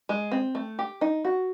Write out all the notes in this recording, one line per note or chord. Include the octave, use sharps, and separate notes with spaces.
G#3
C4
A3
G4
D#4
F#4